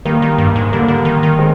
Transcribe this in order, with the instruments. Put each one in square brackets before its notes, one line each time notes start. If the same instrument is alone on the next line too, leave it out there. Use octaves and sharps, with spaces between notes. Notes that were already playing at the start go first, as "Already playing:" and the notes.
[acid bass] D#3 [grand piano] G3 A#3
[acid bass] D#3
G2
G#2
[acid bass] D3 [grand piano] G3 A#3
[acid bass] D3
D#3
D#3
[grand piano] G#3 C4